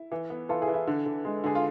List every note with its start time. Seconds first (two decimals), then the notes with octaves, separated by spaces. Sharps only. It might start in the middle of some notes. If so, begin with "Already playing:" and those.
Already playing: E4
0.12 E3
0.30 B3
0.49 E3 F4 A4
0.62 E4 G#4
0.68 E3
0.74 E4
0.87 D3
1.06 D3
1.25 G#3
1.44 D3 G#4
1.55 F4